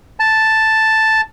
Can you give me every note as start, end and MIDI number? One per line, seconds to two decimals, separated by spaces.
0.20 1.21 81